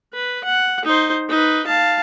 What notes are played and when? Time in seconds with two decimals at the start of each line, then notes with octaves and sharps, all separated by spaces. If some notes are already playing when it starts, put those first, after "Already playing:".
0.14 B4
0.44 F#5
0.85 D#4 C5
1.29 D#4 B4
1.67 F5 A5